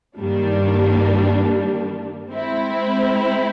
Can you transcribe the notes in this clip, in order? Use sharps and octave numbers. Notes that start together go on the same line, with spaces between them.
G2 D#3 G3 A#3 D4
G#3 C4 E4